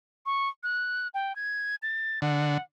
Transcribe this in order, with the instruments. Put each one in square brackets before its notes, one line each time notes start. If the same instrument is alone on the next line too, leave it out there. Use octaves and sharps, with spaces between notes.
[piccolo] C#6
F#6
G5
G#6
A6
[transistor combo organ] D3 [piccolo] F#5